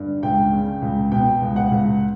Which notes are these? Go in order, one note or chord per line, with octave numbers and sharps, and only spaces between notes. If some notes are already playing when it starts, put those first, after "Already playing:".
Already playing: G2 D3
C#2 G5
C#3
C#2
B2 G5
C#2
F#5
C#2